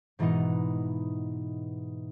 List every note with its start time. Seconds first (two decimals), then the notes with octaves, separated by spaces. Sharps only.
0.19 G#2 B2 E3 G#3 B3 D#4